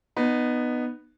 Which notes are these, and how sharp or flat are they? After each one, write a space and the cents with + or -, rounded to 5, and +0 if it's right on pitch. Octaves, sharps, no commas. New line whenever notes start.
B3 +0 D#4 -25